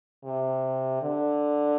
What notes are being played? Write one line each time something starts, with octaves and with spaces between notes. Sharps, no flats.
C3
D3